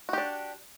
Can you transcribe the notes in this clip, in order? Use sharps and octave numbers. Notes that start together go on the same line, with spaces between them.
D4 F#4 G4